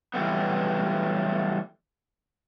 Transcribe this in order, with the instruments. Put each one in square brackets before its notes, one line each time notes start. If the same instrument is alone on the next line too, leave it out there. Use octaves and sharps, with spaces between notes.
[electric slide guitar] E3 F#3 G3 A3 B3